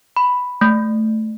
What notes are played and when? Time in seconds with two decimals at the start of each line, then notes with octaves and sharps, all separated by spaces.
0.17 B5
0.61 A3